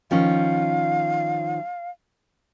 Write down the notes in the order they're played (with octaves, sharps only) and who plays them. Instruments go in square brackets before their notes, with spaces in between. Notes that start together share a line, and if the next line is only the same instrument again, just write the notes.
[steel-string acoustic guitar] D#3 F3 C#4 [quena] F5